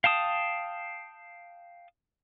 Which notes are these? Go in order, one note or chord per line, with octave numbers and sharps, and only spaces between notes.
F5 G5 A5 D#6